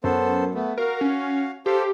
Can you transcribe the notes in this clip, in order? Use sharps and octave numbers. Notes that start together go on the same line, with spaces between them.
F#2 B3 A4 C5
A3 B3
F#4 A#4 F5
C#4
G4 A4 C5 F5